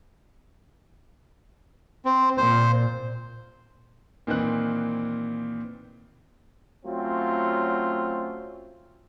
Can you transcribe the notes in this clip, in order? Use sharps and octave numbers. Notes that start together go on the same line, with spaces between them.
C4
A#2 C5
A#2 D#3 E3 C4 F#6
F#3 A3 C4 C#4 F4